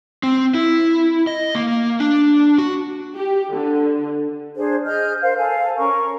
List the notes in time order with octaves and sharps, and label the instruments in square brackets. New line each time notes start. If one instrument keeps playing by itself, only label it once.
[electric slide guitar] C4
E4
D#5
A#3
D4
F#4
[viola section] G4
D3
[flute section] D4 G#4 C5
G#4 D#5 F6 G6
A#4 C5 F5
A4 F5 G#5
C#4 A#4 A#5 C#6